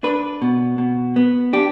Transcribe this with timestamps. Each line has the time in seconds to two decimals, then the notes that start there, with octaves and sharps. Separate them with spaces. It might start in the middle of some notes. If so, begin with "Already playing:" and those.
0.03 D4 B4
0.42 B2
0.78 B2
1.16 B3
1.53 D4 G4